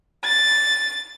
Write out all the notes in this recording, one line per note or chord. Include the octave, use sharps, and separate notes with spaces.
A6